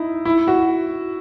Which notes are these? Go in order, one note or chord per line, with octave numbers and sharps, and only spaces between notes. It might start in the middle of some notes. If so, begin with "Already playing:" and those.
Already playing: D#4 E4
E4
F#4